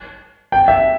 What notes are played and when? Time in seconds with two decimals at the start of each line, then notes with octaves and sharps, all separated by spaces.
0.52 G5
0.68 E5